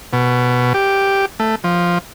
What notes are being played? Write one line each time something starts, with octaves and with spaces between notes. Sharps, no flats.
B2
G4
A3
F3